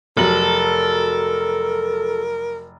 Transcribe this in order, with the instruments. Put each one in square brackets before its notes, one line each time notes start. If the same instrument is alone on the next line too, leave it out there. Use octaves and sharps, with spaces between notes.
[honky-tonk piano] F1 F#3 F#7 [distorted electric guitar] A4 [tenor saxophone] A#4